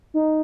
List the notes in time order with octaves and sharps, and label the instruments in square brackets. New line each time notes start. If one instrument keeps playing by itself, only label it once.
[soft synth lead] D#4